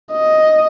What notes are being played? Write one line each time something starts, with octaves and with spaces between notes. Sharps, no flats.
D#5